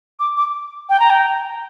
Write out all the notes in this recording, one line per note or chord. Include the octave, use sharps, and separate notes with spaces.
D6
D6
G5
A#5
G5